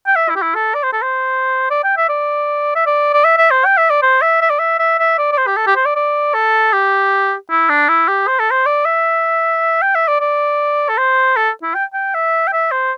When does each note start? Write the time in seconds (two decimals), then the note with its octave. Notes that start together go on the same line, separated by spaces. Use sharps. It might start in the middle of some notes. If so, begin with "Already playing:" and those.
0.07 G5
0.16 E5
0.29 E4
0.36 G4
0.42 E4
0.55 A4
0.74 D5
0.83 C5
0.93 A4
1.02 C5
1.70 D5
1.84 G5
1.97 E5
2.09 D5
2.75 E5
2.86 D5
3.13 D5
3.24 E5
3.38 E5
3.51 C5
3.65 G5
3.78 E5
3.90 D5
4.02 C5
4.22 E5
4.41 E5
4.50 D5
4.59 E5
4.79 E5
4.99 E5
5.18 D5
5.32 D5
5.38 C5
5.47 G4
5.57 A4
5.67 G4
5.76 C5
5.86 D5
5.96 D5
6.34 A4
6.73 G4
7.51 E4
7.69 D4
7.89 E4
8.08 G4
8.27 C5
8.39 A4
8.51 C5
8.66 D5
8.85 E5
9.82 G5
9.95 E5
10.08 D5
10.21 D5
10.89 A4
10.98 C5
11.37 A4
11.62 E4
11.75 G5
11.94 G5
12.14 E5
12.47 G5
12.53 E5
12.72 C5